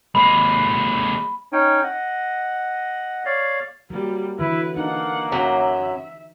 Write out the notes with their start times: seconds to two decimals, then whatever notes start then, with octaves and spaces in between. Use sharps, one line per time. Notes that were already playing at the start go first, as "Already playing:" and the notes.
0.15 G#3 A#3 B5
1.52 C#4 D#4 C#5 G5
1.83 D#5 F#5
3.25 C#5 D5 F5
3.90 F#3 G3 A#3
4.39 D3 E3 F#3 E4 B4
4.77 A#3 D4 D#4 F#5
5.32 F#2 F#3 E5